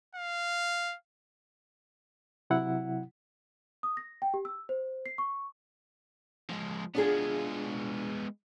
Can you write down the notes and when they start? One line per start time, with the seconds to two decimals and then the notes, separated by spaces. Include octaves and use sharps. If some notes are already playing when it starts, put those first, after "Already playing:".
0.15 F5
2.50 C3 F#3 E4 F#5
3.83 D#6
3.97 A#6
4.22 G5
4.34 G4
4.45 E6
4.69 C5
5.06 C7
5.18 C#6
6.50 F3 G#3
6.95 G#3 B3 D4 F4 G#4